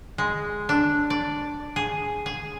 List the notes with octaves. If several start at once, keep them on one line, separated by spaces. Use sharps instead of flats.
G#3
D4
D5
G#4
G#4